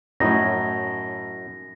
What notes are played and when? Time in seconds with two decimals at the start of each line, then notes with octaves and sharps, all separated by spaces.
0.20 F#2 A2 C#4 D#4 A#6